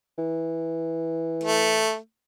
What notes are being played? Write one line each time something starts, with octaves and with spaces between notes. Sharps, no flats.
E3
A3